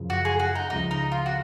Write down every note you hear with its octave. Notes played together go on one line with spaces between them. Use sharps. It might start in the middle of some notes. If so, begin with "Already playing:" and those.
Already playing: F#2 C#3 F3
F#4
G#4
F#4
D#4
C#2 C#3 F3 D#4
D#4
F4
F#4